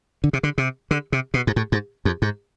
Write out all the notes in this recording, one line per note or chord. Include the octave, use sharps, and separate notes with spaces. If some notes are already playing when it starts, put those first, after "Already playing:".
D3
C3
D3
C3
D3
C3
B2
G#2
A2
G#2
F2
G#2